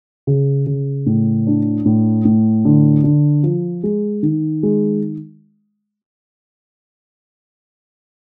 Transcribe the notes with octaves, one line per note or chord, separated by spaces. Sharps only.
C#3
C#3
A2
D4
A2
A2
D3
D3
F3
G#3
D#3
G#3